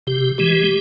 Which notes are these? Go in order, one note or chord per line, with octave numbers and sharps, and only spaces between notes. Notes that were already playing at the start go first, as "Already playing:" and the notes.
C3 G4
E3 G#3 G4